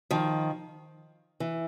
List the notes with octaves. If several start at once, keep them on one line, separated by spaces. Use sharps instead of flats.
D#3 F3
E3